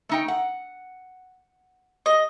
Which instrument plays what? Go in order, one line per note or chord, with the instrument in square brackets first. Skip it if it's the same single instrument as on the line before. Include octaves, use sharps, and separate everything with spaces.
[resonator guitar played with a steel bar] A3 D#4 G5
F#5
[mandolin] D#5